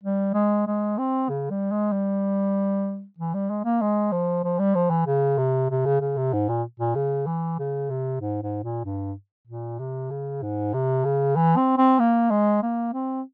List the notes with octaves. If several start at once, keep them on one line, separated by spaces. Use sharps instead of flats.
G3
G#3
G#3
C4
C#3
G3
G#3
G3
E3
G3
G#3
A#3
G#3
F3
F3
G3
F3
E3
C#3
C3
C3
C#3
C#3
C3
G#2
A#2
A#2
C#3
E3
C#3
C3
G#2
G#2
A#2
G2
A#2
C3
C#3
G#2
C3
C#3
E3
C4
C4
A#3
G#3
A#3
C4